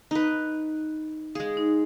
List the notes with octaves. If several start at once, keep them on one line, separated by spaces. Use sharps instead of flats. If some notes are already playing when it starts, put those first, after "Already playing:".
D#4 B4
G#3 G#4 F5
D#4